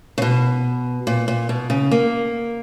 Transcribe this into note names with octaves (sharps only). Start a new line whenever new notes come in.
C#3
B2
A#2
A#2
B2
C#3
A#3